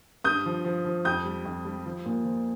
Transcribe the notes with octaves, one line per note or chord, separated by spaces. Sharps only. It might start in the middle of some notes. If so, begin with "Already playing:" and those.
G2 D#6 G6
F3
F3
F3
F2 D#6 G6
G3
F2
G3
F3
A#2
F3